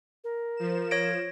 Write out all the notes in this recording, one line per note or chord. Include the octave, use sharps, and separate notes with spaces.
A#4
F3 E7
C#5 A#6 D7